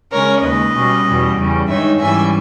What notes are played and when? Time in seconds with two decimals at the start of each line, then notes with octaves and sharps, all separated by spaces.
0.12 C#3 G#3 C#4 A#4 C#5
0.43 D#2 C#3 G#3 B4 D#5
0.75 B2 G3 C#4
1.06 E2 B2 G3 C#4
1.37 E2 C#3 G3 C#4
1.68 G2 D#3 G#3 D#4 C#5 E5
2.00 G#2 E3 G3 C#4 E5 G#5